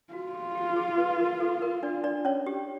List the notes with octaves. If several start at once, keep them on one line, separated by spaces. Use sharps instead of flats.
F4 F#4
G4
G4
G#4
B4
A#4
A4
A#4
D4 D5
D4 D5
C#4 C#5
G4